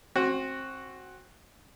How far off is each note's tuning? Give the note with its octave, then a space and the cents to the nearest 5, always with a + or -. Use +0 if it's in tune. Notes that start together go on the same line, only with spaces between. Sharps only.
C4 +25 F#4 +0